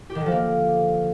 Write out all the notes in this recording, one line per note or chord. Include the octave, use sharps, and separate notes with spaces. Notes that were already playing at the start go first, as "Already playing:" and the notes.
G4
D#3
D3
F3
A#3